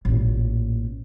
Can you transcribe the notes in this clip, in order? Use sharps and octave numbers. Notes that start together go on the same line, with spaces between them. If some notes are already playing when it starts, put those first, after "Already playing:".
A1 A#2